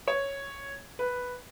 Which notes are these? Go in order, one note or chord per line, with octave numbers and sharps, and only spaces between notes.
C#5
B4